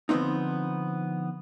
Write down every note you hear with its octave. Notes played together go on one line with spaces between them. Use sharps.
D3 F3 G3 B3 C4 D#4